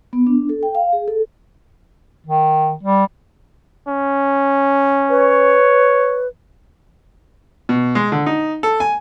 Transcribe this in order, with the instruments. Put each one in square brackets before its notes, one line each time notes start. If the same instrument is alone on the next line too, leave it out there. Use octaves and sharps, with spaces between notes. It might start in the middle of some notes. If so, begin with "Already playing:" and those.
[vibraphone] B3
D4
A4
G5
F5
G#4
A4
[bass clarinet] D#3
G3
[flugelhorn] C#4
[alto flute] B4 [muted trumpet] C#5
[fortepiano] B2
G#3
D3
D#4
A4
G#5